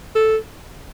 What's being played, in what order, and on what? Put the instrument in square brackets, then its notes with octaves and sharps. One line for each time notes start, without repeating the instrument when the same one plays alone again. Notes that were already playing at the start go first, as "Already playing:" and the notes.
[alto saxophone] A4